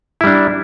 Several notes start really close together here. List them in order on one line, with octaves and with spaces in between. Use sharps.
E4 G3 D4